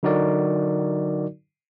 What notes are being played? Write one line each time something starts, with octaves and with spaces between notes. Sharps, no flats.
D3 F#3 D#4 F#4 A#4 D5